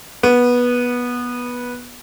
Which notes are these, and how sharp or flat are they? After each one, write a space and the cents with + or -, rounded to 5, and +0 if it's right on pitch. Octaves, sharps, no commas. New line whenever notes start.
B3 -15